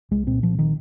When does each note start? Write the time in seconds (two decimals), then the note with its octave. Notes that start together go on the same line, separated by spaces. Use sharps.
0.11 C2 G#3
0.27 A#2 C4
0.42 A#2 F3
0.59 D#3